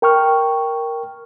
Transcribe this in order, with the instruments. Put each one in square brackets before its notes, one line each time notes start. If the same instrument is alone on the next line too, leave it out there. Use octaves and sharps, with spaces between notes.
[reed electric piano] A#4 G5 C#6 F6